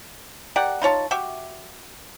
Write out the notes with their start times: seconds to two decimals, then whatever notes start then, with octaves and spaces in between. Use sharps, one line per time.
0.56 G4 A#4 D5 F#5
0.82 D#4 F4 C#5 A5
1.11 F#4 G4 E5